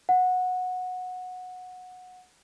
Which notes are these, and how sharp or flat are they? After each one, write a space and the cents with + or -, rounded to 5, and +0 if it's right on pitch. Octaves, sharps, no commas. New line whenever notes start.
F#5 -15